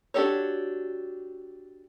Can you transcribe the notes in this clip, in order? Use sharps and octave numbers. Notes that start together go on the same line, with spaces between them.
D4 F#4 G4 A4 C#5